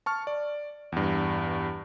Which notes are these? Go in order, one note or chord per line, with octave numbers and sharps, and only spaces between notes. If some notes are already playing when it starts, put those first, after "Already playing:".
A5 C#6 F6
D5
E2 G2